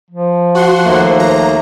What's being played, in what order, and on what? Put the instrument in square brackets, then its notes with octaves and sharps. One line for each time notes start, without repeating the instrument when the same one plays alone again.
[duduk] F3
[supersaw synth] F#4 F#5 C6
[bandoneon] D#2 A3 A#3
[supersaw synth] A#5